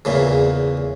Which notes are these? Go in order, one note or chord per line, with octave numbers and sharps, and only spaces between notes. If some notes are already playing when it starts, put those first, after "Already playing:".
E2 A#2 C#3